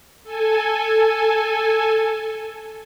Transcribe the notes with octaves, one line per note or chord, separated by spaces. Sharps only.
A4 G#5